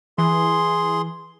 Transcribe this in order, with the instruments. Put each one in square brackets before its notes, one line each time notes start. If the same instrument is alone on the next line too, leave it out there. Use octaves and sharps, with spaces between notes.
[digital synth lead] E3 [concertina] G#4 C6